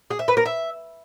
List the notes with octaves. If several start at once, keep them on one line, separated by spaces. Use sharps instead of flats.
G#4
E5
B4
A#4
E5